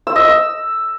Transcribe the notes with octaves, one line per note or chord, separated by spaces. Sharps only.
E6
D#5
E6